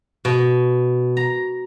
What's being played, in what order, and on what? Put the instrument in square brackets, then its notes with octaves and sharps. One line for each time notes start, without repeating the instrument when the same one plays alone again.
[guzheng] B2
A#5